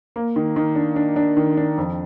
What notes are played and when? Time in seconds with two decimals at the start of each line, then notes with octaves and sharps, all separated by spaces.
0.16 A#3
0.36 D#3
0.56 D#3
0.75 D4
0.96 D4
1.16 D4
1.37 D#3
1.57 D4
1.78 F2